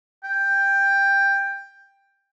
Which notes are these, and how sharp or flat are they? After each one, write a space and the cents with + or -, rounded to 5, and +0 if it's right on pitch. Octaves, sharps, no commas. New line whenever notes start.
G5 +10